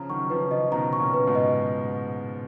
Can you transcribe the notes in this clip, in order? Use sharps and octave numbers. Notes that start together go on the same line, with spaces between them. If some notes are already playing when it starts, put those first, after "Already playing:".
Already playing: C#3 F3 A#5
D#3 F#3 C#6
C#3 F3 B4
C#3 F3 D#5
B2 D#3 A#5
C#6
A#2 C#3
B4
G#2 B2
D#5